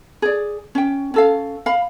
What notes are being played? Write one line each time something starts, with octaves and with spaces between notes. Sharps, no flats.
G#4 D5
C#4 G5
C#4 A4 F5
F5 B5